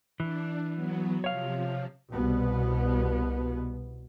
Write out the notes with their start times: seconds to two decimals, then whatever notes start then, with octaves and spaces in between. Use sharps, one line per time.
0.20 E3 D4
0.75 F#3 B3
1.24 C3 F3 C#5 F5
2.12 C2 B2 B3